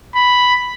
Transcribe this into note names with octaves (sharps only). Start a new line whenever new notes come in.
B5